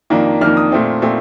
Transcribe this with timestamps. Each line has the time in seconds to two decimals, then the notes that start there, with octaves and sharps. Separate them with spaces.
0.10 F2 D#3 A#3 D4
0.41 F2 D#3 A#3 D4 F6
0.57 D#6
0.72 A#2 A3 C4
1.02 A#2 A3 C4